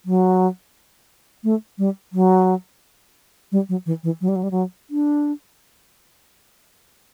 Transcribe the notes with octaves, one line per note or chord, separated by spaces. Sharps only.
F#3
A3
G3
F#3
G3
F#3
E3
E3
F#3
G3
F#3
G3
F#3
D4